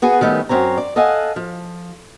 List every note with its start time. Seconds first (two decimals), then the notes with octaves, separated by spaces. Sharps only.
0.02 B3 F#4 G#4 B4
0.21 D#3 G3 A3 B3 C#4
0.49 F#2 C4 C#5 A#5
0.78 D5
0.96 A4 D#5 F5 F#5 G#5
1.36 F3